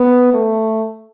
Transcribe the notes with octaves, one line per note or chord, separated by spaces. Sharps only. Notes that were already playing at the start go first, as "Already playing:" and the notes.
Already playing: B3
A3